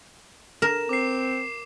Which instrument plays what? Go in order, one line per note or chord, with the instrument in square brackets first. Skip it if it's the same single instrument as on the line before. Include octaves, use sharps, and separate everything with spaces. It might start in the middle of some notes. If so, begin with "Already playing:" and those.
[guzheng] A#4 [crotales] E7
[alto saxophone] C4 [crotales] D6 C7